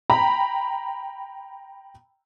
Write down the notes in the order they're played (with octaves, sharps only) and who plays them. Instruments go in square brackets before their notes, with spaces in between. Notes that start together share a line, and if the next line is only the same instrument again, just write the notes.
[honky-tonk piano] G5 A#5 B5